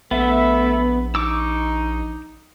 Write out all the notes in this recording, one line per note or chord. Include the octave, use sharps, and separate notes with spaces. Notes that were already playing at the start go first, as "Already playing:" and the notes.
A#1 A3 B3 E5
D#4 C#6 D6 E6